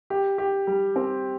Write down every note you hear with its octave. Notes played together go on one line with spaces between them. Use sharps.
G4
G4
G3
C4